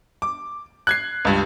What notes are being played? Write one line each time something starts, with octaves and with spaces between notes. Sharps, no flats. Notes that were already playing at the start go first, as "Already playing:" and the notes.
D6
F#6 G#6 C7
C#2 G2